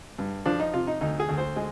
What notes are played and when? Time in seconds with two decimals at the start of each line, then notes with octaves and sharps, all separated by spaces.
0.19 G2
0.46 F3 D4
0.60 D#4
0.73 C3 F4
0.87 D#4
1.01 D2 D#4
1.20 G#4
1.29 D2
1.38 C5
1.56 G#3